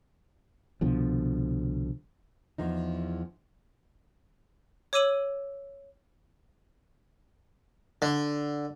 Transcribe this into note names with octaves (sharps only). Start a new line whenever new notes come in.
C2 B2 D3 F3
E2 F3 D#4
C#5 D6 E6 D#7 F#7
D3